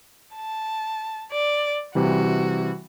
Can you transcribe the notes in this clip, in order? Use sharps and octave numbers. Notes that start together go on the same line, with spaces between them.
A5
D5
C3 E3 G3 F#4